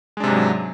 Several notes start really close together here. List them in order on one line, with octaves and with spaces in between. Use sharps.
G#3 D4 C3 G#2 F#3